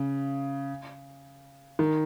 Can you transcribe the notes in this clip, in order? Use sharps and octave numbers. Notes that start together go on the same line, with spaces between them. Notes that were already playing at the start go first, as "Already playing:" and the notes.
Already playing: C#3
D#3